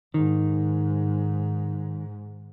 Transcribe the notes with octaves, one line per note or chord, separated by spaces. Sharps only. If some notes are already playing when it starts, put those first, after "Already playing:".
G#2 D#3